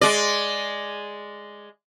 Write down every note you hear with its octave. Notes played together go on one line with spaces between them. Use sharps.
G#3 D5